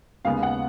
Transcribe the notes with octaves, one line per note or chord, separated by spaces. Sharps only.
D#2 C#3 G#3 B3 F5
F#5